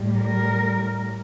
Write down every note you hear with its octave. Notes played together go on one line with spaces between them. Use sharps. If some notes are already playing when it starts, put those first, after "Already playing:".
Already playing: A2 G3
A#4